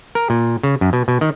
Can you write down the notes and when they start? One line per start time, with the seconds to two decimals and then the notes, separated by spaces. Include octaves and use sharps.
0.15 A#4
0.30 A#2
0.63 C#3
0.81 F#2
0.93 B2
1.08 B2
1.21 D#3